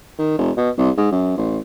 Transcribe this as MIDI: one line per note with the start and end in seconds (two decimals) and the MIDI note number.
0.19 0.38 51
0.38 0.51 29
0.57 0.70 47
0.78 0.90 36
0.97 1.08 44
1.12 1.36 42
1.38 1.58 33